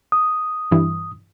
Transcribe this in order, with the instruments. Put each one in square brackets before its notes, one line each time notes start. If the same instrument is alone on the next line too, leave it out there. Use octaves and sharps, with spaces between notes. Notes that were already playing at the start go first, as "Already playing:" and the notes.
[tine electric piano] D#6
[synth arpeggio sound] G2 E3